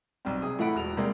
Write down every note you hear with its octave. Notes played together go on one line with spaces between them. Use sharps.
B1 G3 C4
C3 G#4 D#6
A2 E3 A3 F#5 B5 D7
E1 F#4 F7
C3 G3 G#3 A#3